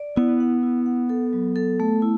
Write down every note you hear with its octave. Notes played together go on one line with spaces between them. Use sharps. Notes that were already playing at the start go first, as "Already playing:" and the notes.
Already playing: D5
B3 E4
F#5
E4
F#5
A4
F#3
A4
A3
E4